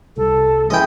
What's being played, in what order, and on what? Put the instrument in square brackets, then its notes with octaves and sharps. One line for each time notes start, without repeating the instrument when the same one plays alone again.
[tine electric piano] C2 [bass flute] A4
[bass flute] E3 [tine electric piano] G#3 C#4 E4 [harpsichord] D#5 G5